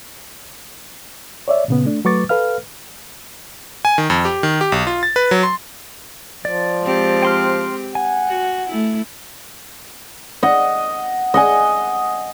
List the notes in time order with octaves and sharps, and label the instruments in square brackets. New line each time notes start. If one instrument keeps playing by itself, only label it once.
[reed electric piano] C#5 D5 E5
A#2 C#3 B3
A3 D4
F#3 A3 B4 C#6 D6 A6
A4 B4 F5 F6
[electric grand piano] G#5
D#3
F2
G4
D#3
G4
B1
F4
A6
B4
F#3
C6
[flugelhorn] F3 [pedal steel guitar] D5
[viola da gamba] G#3 C4 G4
[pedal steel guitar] G5 C6 F6
[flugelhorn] F#5 [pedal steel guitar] G#5
[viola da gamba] F#4
A3 E4
[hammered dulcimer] D#5 F#5
D#5 F#5 G#5